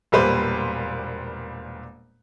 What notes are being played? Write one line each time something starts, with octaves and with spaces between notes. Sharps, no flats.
E1 A#2 G3 B4 C5